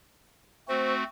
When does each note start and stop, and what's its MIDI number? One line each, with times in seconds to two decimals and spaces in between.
0.68 1.04 57
0.68 1.04 60
0.68 1.04 66
0.68 0.94 72